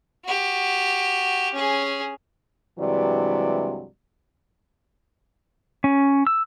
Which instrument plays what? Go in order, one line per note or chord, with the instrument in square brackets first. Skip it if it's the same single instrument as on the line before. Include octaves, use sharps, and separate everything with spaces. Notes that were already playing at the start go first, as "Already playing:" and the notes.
[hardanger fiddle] F#4 G4
C#4 G#4
[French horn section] G2 C3 E3 F#3 G#3 D5
[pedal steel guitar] C#4
E6